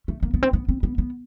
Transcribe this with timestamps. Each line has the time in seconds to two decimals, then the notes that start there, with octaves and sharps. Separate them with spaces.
0.08 A3
0.23 A#3
0.34 B3
0.43 C4
0.53 B3
0.69 C4
0.83 B3
0.98 B3